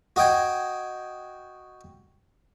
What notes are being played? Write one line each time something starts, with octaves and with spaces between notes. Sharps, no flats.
F#4 D#5 G5 G#5